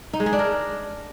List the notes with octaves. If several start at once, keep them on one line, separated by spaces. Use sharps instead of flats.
D#4
G#3
G#4
D4
A#4